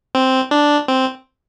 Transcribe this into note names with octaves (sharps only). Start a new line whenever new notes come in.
C4
D4
C4